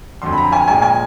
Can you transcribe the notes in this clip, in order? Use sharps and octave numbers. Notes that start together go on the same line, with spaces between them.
F2 D3 F#3 C6
B5
A#5
G#5
A#2 F3 G#3 G#5
G#5